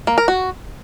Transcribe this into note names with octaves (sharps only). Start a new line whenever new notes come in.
A#3
A#4
F#4